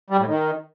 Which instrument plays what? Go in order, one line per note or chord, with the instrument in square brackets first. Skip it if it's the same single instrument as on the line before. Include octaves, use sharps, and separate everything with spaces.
[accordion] G3
A2
D#3